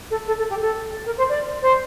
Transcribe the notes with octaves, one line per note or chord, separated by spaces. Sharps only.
A4
A4
A4
G4
A4
A#4
C5
D5
C5